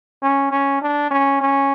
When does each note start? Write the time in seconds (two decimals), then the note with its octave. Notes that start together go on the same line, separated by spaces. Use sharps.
0.22 C#4
0.51 C#4
0.82 D4
1.11 C#4
1.41 C#4